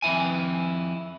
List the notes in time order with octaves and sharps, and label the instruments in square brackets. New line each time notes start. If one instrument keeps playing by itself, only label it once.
[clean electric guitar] F2 G#2 E4 G#5